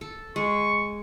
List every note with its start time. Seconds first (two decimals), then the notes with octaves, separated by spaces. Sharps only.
0.01 A4
0.36 G#3 C#6